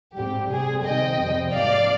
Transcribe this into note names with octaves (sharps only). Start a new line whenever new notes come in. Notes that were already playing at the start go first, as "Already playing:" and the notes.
G#2 G3 C4 G4
C3 G3 C4 G#4
C3 D#3 G3 C4 D#5 G5
F2 C3 G3 C4
G#2 F3 A#3 D5 F5